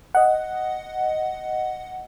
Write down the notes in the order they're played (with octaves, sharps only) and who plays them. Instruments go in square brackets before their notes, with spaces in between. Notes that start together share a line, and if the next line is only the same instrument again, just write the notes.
[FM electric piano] D#5 F#5